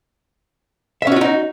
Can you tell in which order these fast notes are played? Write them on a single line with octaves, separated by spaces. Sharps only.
E5 C#4 F#4 F4 D#4